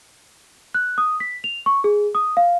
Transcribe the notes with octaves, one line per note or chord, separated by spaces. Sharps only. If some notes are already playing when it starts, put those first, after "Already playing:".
F#6
D#6
B6
F7
C#6
G#4
D#6
F5